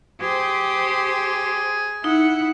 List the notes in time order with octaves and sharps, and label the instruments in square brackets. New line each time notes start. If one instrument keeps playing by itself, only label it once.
[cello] G4 C5 [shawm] G#4
[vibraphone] D#4 [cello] E4 F#5